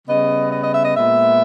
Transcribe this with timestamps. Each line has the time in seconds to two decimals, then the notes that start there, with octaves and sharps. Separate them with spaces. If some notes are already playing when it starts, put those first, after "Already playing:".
0.08 C#3 G3 B3 D#5
0.52 D#5
0.63 D#5
0.74 E5
0.85 D#5
0.96 A#2 G#3 B3 E5